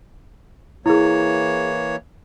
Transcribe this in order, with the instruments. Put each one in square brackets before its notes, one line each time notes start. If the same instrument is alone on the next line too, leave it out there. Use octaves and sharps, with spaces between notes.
[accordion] E3 A#3 C#5 [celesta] E4 G#4